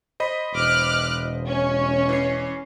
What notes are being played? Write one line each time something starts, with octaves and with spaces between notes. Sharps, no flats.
C5 D#5 B5
E1 D6 F6 F#6
C#4
E3 C7